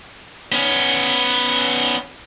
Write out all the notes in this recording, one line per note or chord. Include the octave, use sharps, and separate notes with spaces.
B3 C#4